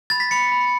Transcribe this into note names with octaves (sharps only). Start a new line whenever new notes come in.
B5 A6
B6
B5 C#7
B5